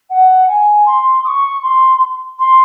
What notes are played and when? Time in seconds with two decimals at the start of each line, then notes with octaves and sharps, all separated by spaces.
0.09 F#5
0.47 G#5
0.85 C6
1.23 D#6
1.27 C#6
1.62 C6
2.38 C6